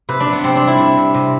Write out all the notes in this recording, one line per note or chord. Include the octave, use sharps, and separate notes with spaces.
C3 B4
D4
C3
B3
C3 C4
D4
G3
E4
C3
C3
C3